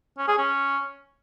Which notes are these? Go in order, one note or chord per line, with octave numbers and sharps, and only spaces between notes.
C#4
G#4
C#4